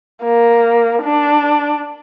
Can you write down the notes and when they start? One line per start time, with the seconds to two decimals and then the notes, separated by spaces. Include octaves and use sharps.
0.23 A#3
1.03 D4